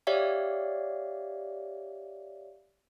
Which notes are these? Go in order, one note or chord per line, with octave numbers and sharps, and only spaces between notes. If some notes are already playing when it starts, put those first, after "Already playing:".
G4 C#5 D5 E5 F5